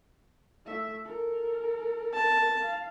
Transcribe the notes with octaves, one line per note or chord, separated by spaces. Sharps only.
A3 E5
A4 A#4
A5
F5